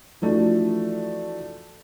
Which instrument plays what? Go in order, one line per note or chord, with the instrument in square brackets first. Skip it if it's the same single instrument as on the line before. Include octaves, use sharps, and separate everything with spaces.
[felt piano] E3 F3 A3 D4 F#4